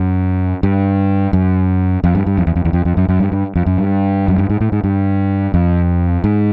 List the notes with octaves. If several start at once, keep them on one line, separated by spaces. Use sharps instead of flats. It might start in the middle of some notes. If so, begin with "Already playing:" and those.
Already playing: F#2
G2
F#2
F2
G2
G2
F2
E2
F2
E2
F2
F2
F#2
F#2
G2
G2
F2
F#2
G2
F#2
G2
G#2
A2
G#2
G2
F2
G#2